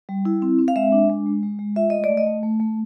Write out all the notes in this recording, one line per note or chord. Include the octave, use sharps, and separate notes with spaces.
G3
E4
C4
C4
F5
G#3 E5
D4
G#3
G#3
G#3
G#3
F4 E5
A3 D#5
D5
A3
D#5
A3
A3
A3